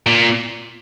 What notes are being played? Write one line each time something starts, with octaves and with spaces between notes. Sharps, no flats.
A#2